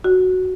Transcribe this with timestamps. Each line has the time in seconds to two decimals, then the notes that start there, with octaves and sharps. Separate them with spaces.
0.04 F#4